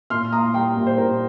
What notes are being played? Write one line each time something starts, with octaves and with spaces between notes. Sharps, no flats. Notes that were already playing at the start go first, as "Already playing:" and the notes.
A#2 C6 F6
A#3 A#5 D#6
G3 G5 C6
A#2
C5
A#2 A#4